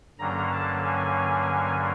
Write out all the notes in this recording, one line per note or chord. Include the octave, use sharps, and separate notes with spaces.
G2 D3 F#3 A#3 C#4 A#5
A5
G#5